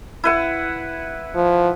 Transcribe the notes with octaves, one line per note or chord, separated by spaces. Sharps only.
E4 B4 F#5
F3